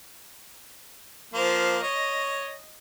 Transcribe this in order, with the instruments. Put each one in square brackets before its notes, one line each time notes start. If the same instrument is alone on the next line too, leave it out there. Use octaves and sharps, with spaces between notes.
[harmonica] F3 A#3 [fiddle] C5
[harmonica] C#5 [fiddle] D#5